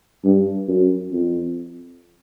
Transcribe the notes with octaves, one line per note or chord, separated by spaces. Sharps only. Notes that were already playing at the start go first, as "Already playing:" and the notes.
G2
F#2
F2